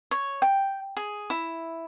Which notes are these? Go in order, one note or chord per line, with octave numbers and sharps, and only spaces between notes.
C#5
G5
G#4
E4